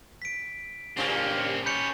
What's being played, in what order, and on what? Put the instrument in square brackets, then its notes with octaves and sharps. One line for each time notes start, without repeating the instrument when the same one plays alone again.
[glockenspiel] B6 D7
[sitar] G2 C#3 F3 [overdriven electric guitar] A#3 C4 [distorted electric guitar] C#4 G4 [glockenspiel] G7
[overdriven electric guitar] B4 C#5 [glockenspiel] G6 C#7